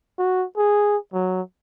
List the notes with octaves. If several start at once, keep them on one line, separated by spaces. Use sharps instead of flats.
F#4
G#4
F#3